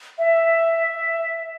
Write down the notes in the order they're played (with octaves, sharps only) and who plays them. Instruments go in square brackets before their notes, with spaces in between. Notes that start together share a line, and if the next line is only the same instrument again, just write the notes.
[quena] E5